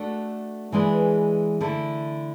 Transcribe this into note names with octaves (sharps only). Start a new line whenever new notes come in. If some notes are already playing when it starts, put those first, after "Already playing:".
Already playing: A3 D4 F#4 A4
E3 G#3 D4 G#4 B4
D3 A3 E4 A4